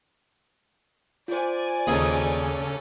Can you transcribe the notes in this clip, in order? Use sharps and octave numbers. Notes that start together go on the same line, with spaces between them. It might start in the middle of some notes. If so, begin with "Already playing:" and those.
F4 C5 D5 G#5
D#2 C#3 C#4 G#4 A4 D#5